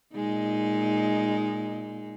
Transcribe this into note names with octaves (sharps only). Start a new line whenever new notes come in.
A#2 G#3 D#4